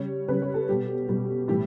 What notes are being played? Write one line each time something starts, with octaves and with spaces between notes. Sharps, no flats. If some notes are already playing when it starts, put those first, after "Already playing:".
Already playing: C#3 G3 C#5
C#3 G3 B4
C#5
A4
B2 G3 G4
B2 G3
A2 E3 G3 G4